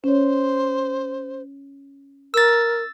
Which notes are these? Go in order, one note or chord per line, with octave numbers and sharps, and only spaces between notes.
C#4 C5 C#5
A#4 E6 A6